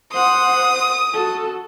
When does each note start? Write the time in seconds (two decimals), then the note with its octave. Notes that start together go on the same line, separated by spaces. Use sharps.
0.13 C5 F#5 D#6
1.13 F#4 A4